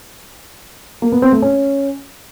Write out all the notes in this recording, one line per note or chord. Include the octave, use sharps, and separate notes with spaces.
A#3
B3
C4
A3
C#4